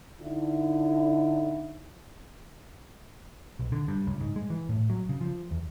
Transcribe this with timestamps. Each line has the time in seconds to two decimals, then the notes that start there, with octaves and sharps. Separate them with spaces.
0.21 D3 D#4 E4
3.60 B1
3.72 D3
3.88 G2
4.07 C#2
4.21 G#2
4.36 G#3
4.50 E3
4.69 A2
4.90 F#3
5.09 C#3
5.21 F3
5.51 E2